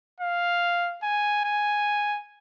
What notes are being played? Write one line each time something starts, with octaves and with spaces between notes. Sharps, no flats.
F5
G#5
G#5